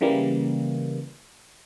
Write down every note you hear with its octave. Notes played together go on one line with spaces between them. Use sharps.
C#3 E3 G3 A#3